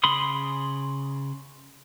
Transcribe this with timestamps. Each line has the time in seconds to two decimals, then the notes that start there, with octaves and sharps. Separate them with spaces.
0.04 C#3 B5 C6 D#6